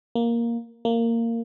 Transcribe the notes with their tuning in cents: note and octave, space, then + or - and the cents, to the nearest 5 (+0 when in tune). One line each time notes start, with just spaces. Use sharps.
A#3 +5
A#3 -15